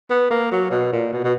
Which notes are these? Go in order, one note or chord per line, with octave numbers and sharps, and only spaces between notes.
B3
A#3
F#3
B2
A#2
B2
B2